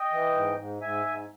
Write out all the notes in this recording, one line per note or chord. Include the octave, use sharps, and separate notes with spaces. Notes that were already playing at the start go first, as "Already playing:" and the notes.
Already playing: D#5 G5
E3
G#2
G#2
G#2 E5 G#5
G#2